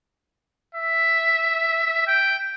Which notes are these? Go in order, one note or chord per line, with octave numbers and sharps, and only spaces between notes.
E5
G5